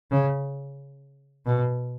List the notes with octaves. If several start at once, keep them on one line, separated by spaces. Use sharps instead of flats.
C#3
B2